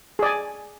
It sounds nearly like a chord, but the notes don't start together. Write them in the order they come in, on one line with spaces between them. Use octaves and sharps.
G#4 D5 G#5